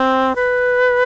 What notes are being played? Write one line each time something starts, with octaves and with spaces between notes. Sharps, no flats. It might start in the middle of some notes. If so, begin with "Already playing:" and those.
Already playing: C4
B4